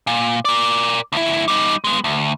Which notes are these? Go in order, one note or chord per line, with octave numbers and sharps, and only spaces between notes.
A#2
A#4 D5
D2 E4
G3 D#4
G#3 B3
D2